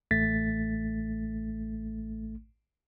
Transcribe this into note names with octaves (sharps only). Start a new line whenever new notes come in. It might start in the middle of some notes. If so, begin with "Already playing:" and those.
A1 A3 A6 B6